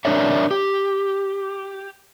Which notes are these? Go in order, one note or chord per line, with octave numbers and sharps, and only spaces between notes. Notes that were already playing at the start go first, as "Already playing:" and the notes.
D4 A#4 C#5 D5 E5
G4